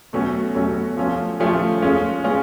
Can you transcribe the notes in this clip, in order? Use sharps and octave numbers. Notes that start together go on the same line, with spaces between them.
B2 F#3 A3 C#4 F#4
B2 F#3 A3 C#4 F#4
F3 A3 C#4 F4
F3 A3 C#4 F4
G#3 C#4 F4
G#3 C#4 F4